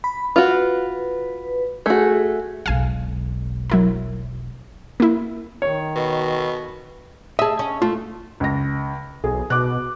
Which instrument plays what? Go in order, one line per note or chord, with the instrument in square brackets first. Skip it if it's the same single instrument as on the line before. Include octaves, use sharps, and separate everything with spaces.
[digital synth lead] B5
[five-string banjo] F4 F#4 [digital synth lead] B4
[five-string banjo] A3 F#4 [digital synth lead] G#4
[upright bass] E1 B1 [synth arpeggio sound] F5 G#5
[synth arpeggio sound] F#3 E4 A#4
A#3 E4
[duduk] D#3 [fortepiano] C#5
[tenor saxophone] B2
[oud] G#4 E5 [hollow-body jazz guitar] D#5 A5
[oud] C#4
[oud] A3 [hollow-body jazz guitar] F4
[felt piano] C#2 A#6
[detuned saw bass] B1 [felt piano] G#4
[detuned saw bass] B2 [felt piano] D6 F#6